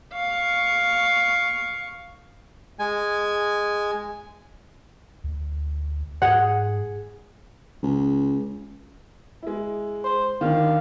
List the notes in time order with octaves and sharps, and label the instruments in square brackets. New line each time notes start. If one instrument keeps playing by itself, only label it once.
[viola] F5 C#6
[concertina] G#3 G#5
[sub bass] D2
[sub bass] G#2 [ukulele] G#4 F#5
[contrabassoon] C#2
[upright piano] G#3 E4
[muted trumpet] C5
[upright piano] D#3 D4 [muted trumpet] F5